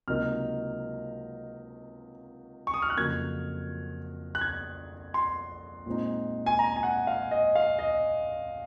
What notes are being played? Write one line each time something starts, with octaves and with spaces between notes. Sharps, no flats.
C#2 C3 F#3 A#3 D#4 F6
C#6
D#6
F6
F#6
F2 C#3 F#3 A#3 G#6
F#6
G#6
C6
A#2 G#3 C4 D#4
G#5
A#5
G#5
F#5
F5
D#5
F5
D#5